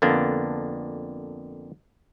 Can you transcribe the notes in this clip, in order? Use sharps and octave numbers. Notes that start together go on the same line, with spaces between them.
F2 D3 A#3 B3 D4